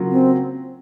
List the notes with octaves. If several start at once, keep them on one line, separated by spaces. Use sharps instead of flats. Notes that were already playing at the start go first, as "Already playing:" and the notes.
Already playing: C#3 F#3 A#3 F4
C4